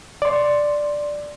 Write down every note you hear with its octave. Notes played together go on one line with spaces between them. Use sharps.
D5 C6